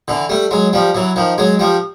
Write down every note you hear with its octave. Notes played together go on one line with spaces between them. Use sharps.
D3 E3
G3 A3
F#3 G#3
F3 G3
E3 F#3
D#3 F3
F#3 G#3
F3 G3